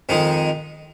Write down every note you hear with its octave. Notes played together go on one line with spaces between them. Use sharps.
F2 D#3 G#3 D#4